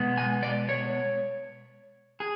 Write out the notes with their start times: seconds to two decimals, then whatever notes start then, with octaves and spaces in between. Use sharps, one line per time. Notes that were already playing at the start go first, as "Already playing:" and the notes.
Already playing: B2 G#3 B3
0.18 G#5
0.43 D5
0.69 C#5
2.20 G#4